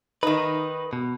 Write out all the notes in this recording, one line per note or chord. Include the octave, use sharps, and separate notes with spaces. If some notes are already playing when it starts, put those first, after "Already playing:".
D#3 D#4 B4
B2